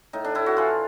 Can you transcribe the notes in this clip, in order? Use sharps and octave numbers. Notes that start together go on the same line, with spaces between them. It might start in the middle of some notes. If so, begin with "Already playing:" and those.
A2 D#4
D4
A2 E4
F#4
E3 F4